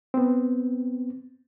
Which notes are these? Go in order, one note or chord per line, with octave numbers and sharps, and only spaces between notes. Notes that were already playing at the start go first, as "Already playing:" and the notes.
B3 C4